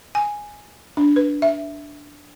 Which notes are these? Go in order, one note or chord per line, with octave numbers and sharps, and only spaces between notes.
G#5
D4
B4
E5